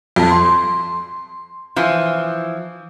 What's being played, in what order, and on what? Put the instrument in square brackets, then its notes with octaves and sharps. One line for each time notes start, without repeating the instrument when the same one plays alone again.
[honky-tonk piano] F2
C6
[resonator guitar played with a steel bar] E3 F3